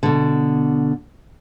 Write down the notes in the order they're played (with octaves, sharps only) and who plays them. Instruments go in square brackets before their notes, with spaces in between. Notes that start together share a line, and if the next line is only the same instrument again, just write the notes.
[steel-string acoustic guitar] B2 D3